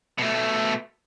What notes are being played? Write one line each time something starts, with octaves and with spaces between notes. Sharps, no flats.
B2 A3